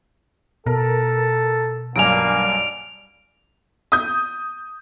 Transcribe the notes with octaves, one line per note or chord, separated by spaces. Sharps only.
B2 A4 A#4
B1 G2 A#3 G#5 D7 F7
D#6 G6